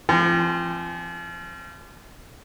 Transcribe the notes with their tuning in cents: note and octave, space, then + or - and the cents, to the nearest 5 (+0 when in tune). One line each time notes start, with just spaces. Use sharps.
F3 -35 C4 +0 G5 +30